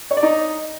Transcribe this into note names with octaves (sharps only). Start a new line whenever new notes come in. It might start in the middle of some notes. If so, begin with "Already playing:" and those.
C#5
D5
D#4